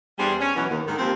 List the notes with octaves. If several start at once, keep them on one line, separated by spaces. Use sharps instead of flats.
E2 G3 B3 D4 G#4 C5
C#4
B2 E3 F#3
D#2
G#2 D3 D#3
D#2 F3 C4